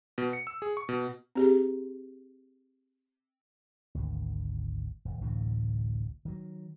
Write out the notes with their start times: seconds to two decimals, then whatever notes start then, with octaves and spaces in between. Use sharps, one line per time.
0.18 B2
0.33 C#7
0.47 E6
0.62 G#4
0.77 C#6
0.89 B2
1.35 C4 G4 G#4
3.95 G#1 D2
5.05 D#1
5.21 A1 D2 A2 C3
6.25 D#3 F#3